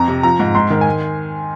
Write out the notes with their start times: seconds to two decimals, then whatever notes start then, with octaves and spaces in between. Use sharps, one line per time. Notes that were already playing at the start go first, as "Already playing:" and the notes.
Already playing: F2 A#5
0.08 C3
0.23 F3 A#5
0.39 G#2
0.55 G#2 C6
0.70 D#3
0.81 G#5